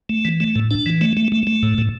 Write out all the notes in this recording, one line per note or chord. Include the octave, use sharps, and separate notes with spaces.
A3
E3
A3
A2
D4
E3
A3
A3
A3
A3
A2
A2